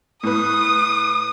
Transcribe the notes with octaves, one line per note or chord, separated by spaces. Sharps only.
A2 B4 D#6